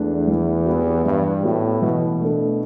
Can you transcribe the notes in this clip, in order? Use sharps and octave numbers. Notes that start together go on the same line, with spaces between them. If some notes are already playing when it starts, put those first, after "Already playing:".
Already playing: E2 A3 D4
E3
B3 G4
G2 E3
A2 B3 G4
B2 E3
A3 D4 A4